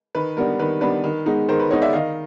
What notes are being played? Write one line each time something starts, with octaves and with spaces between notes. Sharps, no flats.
D#3 B4
G3 B3 D4 A#4
D#3 B4
G3 B3 D4 B4
D#3
G#3 B3 D#4
D#3 A#4 C5
B4
G#3 B3 D#4 C#5 D#5
D5 E5
D#3 D#5 F5